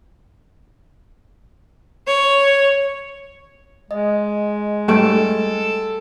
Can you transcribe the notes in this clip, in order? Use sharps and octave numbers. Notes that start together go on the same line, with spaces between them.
C#5
G#3 D#5
G3 A3 A4 G5 D7